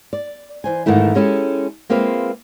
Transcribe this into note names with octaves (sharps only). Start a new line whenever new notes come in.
D5
E3 C5 G#5
G#2 D#3 E3 A3 E4
G#3 C#4 E4 G4 A4
G#3 A#3 C4 F4 B4 E5